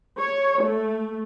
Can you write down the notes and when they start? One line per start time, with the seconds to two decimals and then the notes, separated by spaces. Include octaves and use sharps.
0.19 C#5
0.61 A3